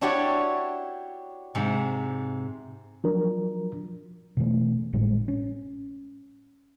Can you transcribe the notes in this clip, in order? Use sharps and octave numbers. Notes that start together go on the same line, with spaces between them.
D4 E4 F#4 G4 C#5 D5
G#2 C3
F3 F#3 D4 A#4
B2 E3 F#3 A3
G#1 A2 G3 G#3
C#4